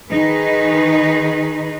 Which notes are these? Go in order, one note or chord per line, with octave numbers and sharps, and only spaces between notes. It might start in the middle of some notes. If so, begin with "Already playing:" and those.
D#3 D#4 G#4 B4